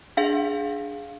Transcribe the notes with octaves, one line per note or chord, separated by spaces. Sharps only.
D4 G#4 F5